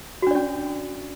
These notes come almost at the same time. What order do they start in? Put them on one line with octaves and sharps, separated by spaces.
F#4 D4 D5 C#4